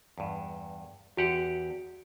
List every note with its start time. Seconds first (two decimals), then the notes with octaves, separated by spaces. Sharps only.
0.18 E2 G2
1.17 E2 F#4 G4 F#5